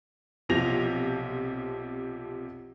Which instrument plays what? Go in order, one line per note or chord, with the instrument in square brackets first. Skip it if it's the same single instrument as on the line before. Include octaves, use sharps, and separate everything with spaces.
[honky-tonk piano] B1 C3 F3 A#6 F7